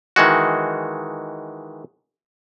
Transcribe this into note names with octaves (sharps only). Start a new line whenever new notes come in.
D#3 E3 G#3 F#4